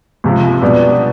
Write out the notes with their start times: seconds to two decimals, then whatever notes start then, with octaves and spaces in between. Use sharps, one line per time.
0.24 C#2 C3 F3
0.62 B2 G3 B3 D4